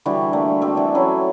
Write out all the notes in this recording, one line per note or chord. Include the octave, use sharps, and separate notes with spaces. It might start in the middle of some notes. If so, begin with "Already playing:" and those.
D3 E3 G3 F#4
G3 A3 A#3
G3 C4 F#4 A4
E3 D4
F#3 A3 C#4 E4